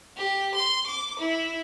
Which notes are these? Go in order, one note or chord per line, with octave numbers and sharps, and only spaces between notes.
G4
C6
D6
E4